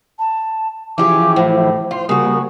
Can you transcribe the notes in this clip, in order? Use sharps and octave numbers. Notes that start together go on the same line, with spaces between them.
A5
E3 F3 C#4 E4 G4 G#4 D6
A2 C5
F4 C5
C#3 G3 A#3 F#4 D#6